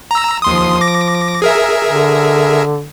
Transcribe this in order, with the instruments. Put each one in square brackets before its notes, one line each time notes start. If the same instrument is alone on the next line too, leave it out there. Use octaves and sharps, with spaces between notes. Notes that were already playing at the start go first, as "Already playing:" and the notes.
[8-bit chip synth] A#5 E6
[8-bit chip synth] D#2 C6 D#6 [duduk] F3
[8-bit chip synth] D6 A#6
G#4 A#4 E5
[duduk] D3